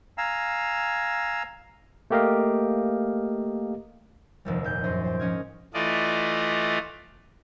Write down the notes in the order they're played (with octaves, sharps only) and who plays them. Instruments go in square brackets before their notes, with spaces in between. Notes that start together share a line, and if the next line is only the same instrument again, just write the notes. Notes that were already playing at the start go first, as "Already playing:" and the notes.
[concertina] F5 G#5 A#5 E6
[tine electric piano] A3 A#3 G4 A#4 D#5 F5
[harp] F1 D#2 G3
A#2 G3 G6
F#2 C5 A#6
C5 G5
G#2 F3 C#4 D#5 F6 G#6
[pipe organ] E3 A3 F4 D5 D#5